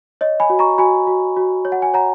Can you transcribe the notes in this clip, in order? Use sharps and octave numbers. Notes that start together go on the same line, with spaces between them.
C#5 D#5
G#5 B5
F#4
A#5 C#6
F#4 G#5 B5
F#4
F#4
C#5
F#5
G#5
C#5 F#5 A#5